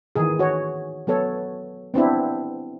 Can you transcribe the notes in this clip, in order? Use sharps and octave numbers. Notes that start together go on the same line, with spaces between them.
D#3 E3 G#4
F#4 C#5
F#3 B3 A4 C#5
B3 C4 D4 E4